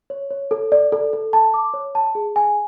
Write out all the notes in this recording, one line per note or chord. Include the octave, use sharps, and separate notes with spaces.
C#5
C#5
A4
D5
A4
A4
A5
D6
C#5
A5
G#4
G#5